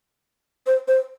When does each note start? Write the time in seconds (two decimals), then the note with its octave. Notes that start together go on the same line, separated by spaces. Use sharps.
0.67 C5
0.88 C5